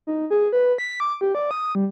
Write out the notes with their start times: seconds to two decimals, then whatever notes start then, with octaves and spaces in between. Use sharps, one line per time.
0.07 D#4
0.30 G#4
0.53 B4
0.78 B6
1.00 D6
1.21 G4
1.35 D5
1.51 D#6
1.75 G3